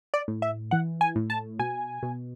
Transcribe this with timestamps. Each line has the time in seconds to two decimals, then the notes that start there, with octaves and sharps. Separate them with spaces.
0.14 D5
0.28 A2
0.42 E5
0.71 E3 F#5
1.01 G#5
1.16 A2
1.30 A5
1.59 B2 G#5
2.03 B2